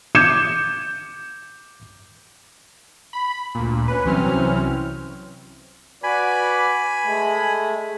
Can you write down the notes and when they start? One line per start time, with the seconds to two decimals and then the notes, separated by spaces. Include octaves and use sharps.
0.15 D6 G6 G#6 C#7 E7
3.13 B5
3.55 D2 A#2
3.88 C#4 B4
4.05 C2 E3 F#3 C4 C#4 F6
6.03 F#4 B4 D5 G#5 B5
7.04 G#3 A3